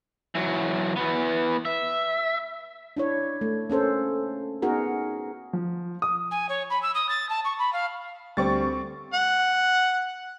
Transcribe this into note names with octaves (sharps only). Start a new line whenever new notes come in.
E3 F#3
E3 B3
E5
D4 E4 C#5
A3
A#3 C#4 A4 C5
B3 D#4 F#4 G#4 A#4
F3
D#6
G#5
C#5
B5
E6
D#6
A6
A5
C#6
B5
F5
D2 G3 C4 C#6 A6
F#5